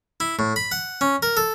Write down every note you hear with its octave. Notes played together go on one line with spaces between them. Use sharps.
E4
A2
B5
F#5
C#4
A#4
A4